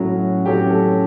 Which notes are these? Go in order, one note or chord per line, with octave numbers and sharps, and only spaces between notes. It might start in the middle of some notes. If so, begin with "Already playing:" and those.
Already playing: A2 F#3 C#4 F#4
A2 F#3 C#4 G4
A4